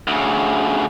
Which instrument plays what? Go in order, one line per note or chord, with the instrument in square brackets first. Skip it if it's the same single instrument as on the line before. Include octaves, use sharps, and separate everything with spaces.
[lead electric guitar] D2 C#3